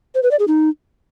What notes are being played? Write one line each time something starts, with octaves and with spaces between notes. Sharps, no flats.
C5
B4
D5
G#4
D#4